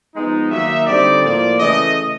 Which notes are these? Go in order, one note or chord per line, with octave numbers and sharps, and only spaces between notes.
F3 G#3 B3 D#4
D#3 F#3 A#3 D#4 E5
D3 G3 C4 D#4 D5
A2 F3 A#3 D5
C#3 E3 A3 D#5